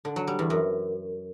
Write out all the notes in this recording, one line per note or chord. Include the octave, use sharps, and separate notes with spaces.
D3
F#3
G3
E2
F#2